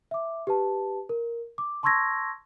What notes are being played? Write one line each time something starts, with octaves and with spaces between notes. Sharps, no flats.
E5 D6
G4 B4 A5
A#4
D6
A5 C6 C#6 E6 G#6 A#6